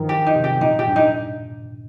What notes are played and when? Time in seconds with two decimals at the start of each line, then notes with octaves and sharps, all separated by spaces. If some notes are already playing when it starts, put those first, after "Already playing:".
Already playing: G2 D#3 F3
0.09 G4
0.27 D#4
0.35 C3
0.44 G4
0.61 A#2 D#4
0.79 G4
0.87 G2
0.96 D#4